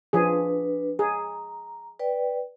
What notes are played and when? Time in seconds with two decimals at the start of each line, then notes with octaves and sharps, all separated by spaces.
0.13 F3 D4 G#4 B4
0.99 G#4 A#5
1.99 B4 D5 G5